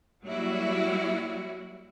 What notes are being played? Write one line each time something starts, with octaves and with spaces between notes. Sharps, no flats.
F#3 G3 A#3 E4 F#4